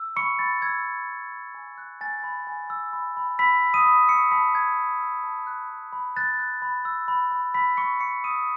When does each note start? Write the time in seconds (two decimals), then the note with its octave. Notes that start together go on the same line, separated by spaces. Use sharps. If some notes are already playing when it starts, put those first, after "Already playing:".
Already playing: E6
0.16 B5 C#6 C#7
0.39 B5 A6
0.62 E6 G#6
0.85 E6
1.09 B5
1.32 B5
1.54 G#5
1.78 F#6
2.01 G#5 A6
2.24 B5
2.47 G#5
2.70 E6
2.93 B5
3.17 B5
3.39 B5 E6 B6
3.62 E6
3.74 D#6 D#7
3.85 B5
4.08 C#6 E6 C#7
4.31 A5 B5 B6
4.55 A5 G#6
4.78 E6
5.01 E6
5.24 A5
5.47 F#6
5.70 B5
5.93 B5
6.16 F#6 A6
6.39 F#6
6.62 B5
6.85 E6
7.08 B5
7.32 B5
7.54 B5 E6 B6
7.77 C#6 E6 C#7
8.01 B5 C#6 C#7
8.24 D#6 E6 D#7